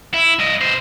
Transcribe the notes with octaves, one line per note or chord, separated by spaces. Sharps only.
E4
G2 D#5
B2 C5